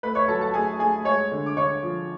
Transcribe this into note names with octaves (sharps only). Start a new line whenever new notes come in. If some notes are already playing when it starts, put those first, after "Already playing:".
A3 B4 B5
C#5 C#6
F#3 A4 A5
A4 A5
A3 G#4 G#5
A3 G#4 G#5
G#3 C#5 C#6
D3
D6
D3 C#5 C#6
F3